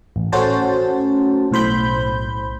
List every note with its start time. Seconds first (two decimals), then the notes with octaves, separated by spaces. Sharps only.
0.16 A1
0.32 A3 C#4 F#4 C5 A5
1.51 B1 A2 C5 B5 G6